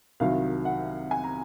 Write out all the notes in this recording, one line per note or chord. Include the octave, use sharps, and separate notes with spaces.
C2 C3 D#3 F#3 F5
F#5
G#5
A#5